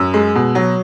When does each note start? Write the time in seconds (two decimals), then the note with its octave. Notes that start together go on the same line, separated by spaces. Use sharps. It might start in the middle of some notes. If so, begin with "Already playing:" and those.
Already playing: F#2 E6
0.14 G#3
0.35 B2
0.55 F#3